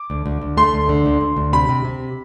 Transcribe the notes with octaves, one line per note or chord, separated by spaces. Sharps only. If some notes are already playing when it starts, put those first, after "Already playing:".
Already playing: D6
D2
D2
D2
A3 C6
D2
D3
D2
D2
D2
C3 B5
C3
C3